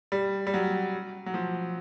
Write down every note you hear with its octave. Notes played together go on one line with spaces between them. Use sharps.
G3
G3
F#3
F#3
F3